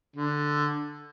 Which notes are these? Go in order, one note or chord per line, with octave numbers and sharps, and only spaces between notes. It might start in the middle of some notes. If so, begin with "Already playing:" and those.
D3